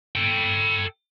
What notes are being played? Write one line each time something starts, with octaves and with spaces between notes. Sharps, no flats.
A4 G5